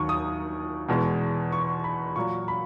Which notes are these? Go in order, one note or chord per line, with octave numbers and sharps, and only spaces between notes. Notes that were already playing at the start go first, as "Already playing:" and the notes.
Already playing: D#2 D#3 F#3 C#6
D#6
E2 B2 G#3
C#6
B5
A#2 F#3 C#6
B5